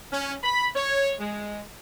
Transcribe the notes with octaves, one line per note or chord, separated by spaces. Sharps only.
C#4
B5
C#5
G#3